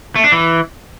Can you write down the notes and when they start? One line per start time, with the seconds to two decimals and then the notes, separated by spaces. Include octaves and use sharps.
0.15 A3
0.24 D4
0.32 E3